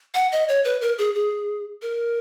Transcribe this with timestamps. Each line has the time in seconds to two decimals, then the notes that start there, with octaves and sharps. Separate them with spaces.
0.14 F#5
0.32 D#5
0.48 C#5
0.65 B4
0.81 A#4
0.98 G#4
1.15 G#4
1.82 A#4